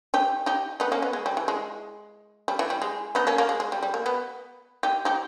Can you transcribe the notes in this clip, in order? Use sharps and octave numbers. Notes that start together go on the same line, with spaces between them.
D#4 G4
D#4 G4
B3 D#4
A#3 C#4
B3
G#3
G3
E3
G#3
G3
E3
G3
G#3
B3 D#4
A#3 C#4
A#3
G#3
G#3
G3
G3
A#3
B3
D#4 G4
D#4 G4